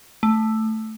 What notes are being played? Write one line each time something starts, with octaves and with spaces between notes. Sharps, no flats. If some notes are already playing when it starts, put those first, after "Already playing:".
A3